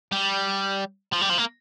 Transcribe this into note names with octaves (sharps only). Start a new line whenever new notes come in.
G3
F3
G3
F3
A#3